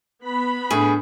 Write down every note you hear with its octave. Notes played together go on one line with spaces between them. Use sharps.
B3 B5
A2 D4 G#4